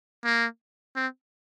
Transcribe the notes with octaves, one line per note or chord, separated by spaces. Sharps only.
A#3
C4